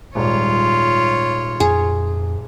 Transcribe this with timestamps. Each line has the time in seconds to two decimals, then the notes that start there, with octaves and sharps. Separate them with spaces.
0.15 D#1 G#2 G3 F4 C#5
1.60 F2 G#4